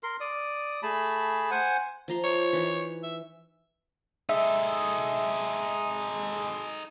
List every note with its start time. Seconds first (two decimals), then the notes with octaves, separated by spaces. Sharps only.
0.03 A#4 C6
0.20 D5 D#6
0.83 A3 G#4 A5 B5
1.51 C5 F#5 G#5
2.08 F3 A#5 C6
2.24 C#5
2.53 E3 D#4
3.03 E5
4.29 G#3 D#4 A4 E5